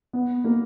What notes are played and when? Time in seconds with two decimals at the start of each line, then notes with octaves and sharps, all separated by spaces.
0.13 B3
0.44 A#3